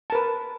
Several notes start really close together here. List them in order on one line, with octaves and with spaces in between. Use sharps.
A5 A#4 B4